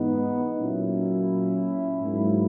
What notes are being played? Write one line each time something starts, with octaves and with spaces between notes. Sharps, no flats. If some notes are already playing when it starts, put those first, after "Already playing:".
Already playing: G#2 E3 G#3 B3 D#4
A#2 F#3 A#3 C#4 E4
G#2 F#3 A#3